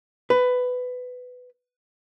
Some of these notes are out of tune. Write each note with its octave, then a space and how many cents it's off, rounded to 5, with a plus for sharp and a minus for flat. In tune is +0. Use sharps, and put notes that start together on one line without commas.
B4 +15